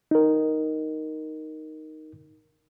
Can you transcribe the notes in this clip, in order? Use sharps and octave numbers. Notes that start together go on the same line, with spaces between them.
D#4 A#4